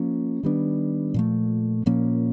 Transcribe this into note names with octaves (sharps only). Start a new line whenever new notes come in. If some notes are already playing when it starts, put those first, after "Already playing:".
Already playing: F3 A#3 C#4
D#3 G3 B3 D4
A#2 F3 A3
A#2 F3 A#3 C#4